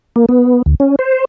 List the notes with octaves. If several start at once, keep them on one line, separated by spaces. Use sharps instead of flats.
A#3
B3
D2
C#4
C5